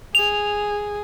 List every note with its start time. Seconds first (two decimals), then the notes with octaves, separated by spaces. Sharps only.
0.15 G#4 F7